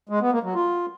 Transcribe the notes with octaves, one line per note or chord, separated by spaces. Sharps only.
G#3
B3
A#3
F#3
F4